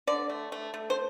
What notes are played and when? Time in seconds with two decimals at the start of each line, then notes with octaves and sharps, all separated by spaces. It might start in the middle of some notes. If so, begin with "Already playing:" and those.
0.07 D3 D5
0.30 A3
0.52 A3
0.74 A3
0.90 C5